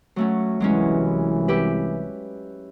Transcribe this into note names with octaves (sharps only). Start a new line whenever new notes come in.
F#3 A3 C#4
C2 E3 F#3 G#3 C#4
E4 G4 B4